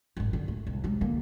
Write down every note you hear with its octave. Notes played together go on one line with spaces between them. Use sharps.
G#1 F#2
D3
A3
C2
F#3 G#3
D3 A#3